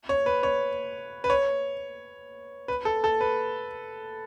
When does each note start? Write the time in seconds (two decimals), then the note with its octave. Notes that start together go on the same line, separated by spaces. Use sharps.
0.09 C#5
0.26 B4
0.43 C#5
1.24 B4
1.30 C#5
2.68 B4
2.85 A4
3.04 A4
3.21 B4